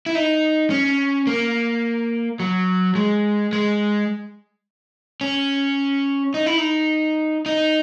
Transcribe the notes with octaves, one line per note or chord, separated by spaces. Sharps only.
E4
D#4
C#4
A#3
F#3
G#3
G#3
C#4
D#4
E4
D#4
D#4